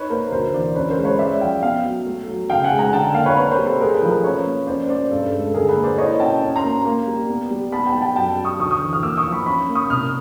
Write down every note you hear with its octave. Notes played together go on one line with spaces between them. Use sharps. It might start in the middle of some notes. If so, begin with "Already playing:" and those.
Already playing: D#4 B4 C#5
A#3 A#4 C5
D2 A#4 C5
E3 C5 D5
C#4 B4 C#5
A#4 C5
G#3
B4 C#5
G#3 D5 E5
F3 F5 G5
B3 F5 G5
F#3
A3
F#3
C#3 F5 G5
F#5 G#5
G#3
G#5 A#5
D3 G5 A5
A#3 F5 G5
B4 C#5
C4 B4 C#5
A#4 C5
G3
A4 B4
A3 G#4 A#4
A4 B4
F3
A#4 C5
C#4 B4 C#5
A#3
C#4 C5 D5
A3 C5 D5
G2 A4
A4
G#3
A4
D3 G#4 A#4
A4 B4
A#3
C5 D5
E4 C#5 D#5
C#4 G5 A5
C#4
A#5 C6
A#3
A#3
G3
B3
G3
B3 A5 B5
G5 A5
G3
G5 A5
F#2 G5 A5
G3
C#6 D#6
D2 C#6 D#6
C#6 D#6
E3
D#6 F6
A#3 D6 E6
C#6 D#6
F3
B5 C#6
C#4 B5 C#6
A#3
C#6 D#6
C2 D#6 F6